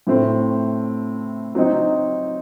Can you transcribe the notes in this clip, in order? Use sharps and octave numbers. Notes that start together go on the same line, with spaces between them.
A2 A3 C4
F#3 C4 D#4